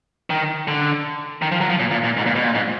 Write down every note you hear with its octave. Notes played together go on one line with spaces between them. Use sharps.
D#3
D3
D#3
F3
F#3
F3
A#2
A#2
A#2
G#2
A#2
B2
A#2
G#2